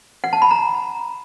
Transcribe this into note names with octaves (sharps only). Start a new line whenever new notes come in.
F#5
A5
B5
A#5